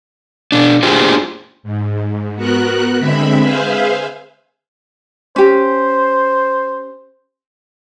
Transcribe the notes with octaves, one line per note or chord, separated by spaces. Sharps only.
B2 D4
D4 F4 G4 G#4 C5
G#2
B3 F#4 A#4 F#6
D3 G#3 C4 E5 B5
G#4 B4 C5 E5 F5
C#4 G4 C5